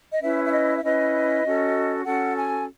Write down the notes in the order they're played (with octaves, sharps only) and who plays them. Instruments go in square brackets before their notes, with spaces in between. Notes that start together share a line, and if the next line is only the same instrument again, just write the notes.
[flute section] D#5
C#4 E4 B4 E5
E5
D#5
E5
C#4 E4 B4 D#5
C#4 F#4 A4
C#4 F#4 A4 F#5
G#5